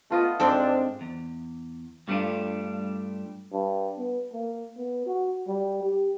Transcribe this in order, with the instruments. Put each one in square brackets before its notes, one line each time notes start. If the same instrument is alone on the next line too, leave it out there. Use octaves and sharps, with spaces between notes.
[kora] A3 F4 D#5 [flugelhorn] B3
[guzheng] G#2 C4 D5 [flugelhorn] D4 [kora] A4
[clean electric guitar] E2
G2 G3 A3 B3 D4 F4
[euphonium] G2
B3
A#3
B3
F#4
G3
G4